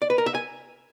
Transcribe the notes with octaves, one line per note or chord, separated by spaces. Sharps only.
D5
B4
A#4
E5
G#5